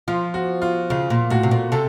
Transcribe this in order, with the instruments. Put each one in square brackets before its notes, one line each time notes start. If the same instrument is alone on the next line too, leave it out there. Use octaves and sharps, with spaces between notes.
[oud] F3 [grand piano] F4
[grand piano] F#4
F4
[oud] C#3 [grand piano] F4
[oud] A#2
[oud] A2 [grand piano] F#4
[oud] C3
A#2
[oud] C3 [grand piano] A4